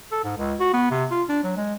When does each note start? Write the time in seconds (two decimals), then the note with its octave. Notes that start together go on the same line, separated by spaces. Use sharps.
0.12 A4
0.24 G#2
0.37 C#2
0.60 F#4
0.73 B3
0.91 C3
1.11 F4
1.29 D4
1.43 F#3
1.57 G#3